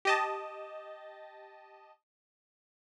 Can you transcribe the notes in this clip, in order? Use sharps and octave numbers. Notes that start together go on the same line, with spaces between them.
G4 D#5 A5